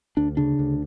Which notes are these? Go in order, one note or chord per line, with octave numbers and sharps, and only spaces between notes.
D2 D4
C#3 D4
D2